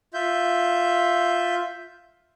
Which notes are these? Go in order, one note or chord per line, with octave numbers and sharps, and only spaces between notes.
F4 E5 G6